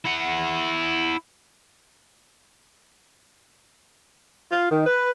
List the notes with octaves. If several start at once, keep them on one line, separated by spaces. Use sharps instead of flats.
E4 F#5
F4
D#3
B4